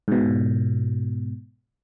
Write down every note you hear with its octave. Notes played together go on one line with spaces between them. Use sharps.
G#2 B2